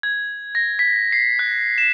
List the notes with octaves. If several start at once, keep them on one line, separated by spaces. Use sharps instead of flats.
G#6
A#6
B6
C7
F#6
E7